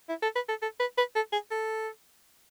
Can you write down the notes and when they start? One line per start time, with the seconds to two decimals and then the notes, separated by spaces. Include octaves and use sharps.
0.09 E4
0.22 A4
0.35 B4
0.49 A4
0.62 A4
0.80 B4
0.98 B4
1.15 A4
1.32 G#4
1.51 A4